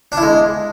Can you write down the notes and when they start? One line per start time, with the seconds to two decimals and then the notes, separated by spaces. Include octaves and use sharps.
0.12 D4
0.17 E4
0.23 G#3